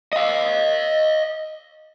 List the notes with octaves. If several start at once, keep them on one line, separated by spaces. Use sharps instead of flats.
D#5 F5